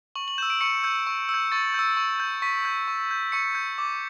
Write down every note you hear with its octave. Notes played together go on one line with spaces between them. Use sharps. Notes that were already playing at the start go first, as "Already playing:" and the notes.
C#6 F#7
F#7
E6 G6 E7
D7
C#6 C#7
E6 G6
C#6
E6
G6
C#6 A6
E6 G6
C#6
G6
C#6 B6
G6
C#6
G6
C#6 C#7
G6
D6